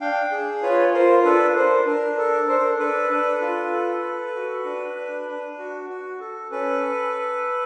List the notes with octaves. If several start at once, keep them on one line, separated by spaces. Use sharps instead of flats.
D4 F5 G5
G#4
F4 B4 C#5
F4 A#4 C5
D4 A4 B4
D4 A#4 C5
D4 A#4
A4 A#4
D4 A#4 C5
D4 A4 B4
D4
F4
A4
A4
F#4
D4
D4
D4
F#4
F#4
A4
C#4 A4 B4